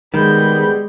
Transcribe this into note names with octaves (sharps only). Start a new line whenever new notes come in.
D#3 G3 G#3 B3 G#4 B5 G6